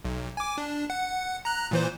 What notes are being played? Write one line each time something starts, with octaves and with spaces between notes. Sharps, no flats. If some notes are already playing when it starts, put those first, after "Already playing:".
B1
G#5 D6
D4
F#5
A#5 F#6
A#2 E3 C5